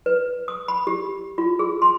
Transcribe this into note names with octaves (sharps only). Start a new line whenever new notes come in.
B4
D#6
B5
G4
F4
G#4
C6